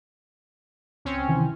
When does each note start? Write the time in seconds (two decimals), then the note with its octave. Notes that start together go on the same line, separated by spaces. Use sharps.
1.05 C#2 C4 C#4
1.28 C3 D#3 E3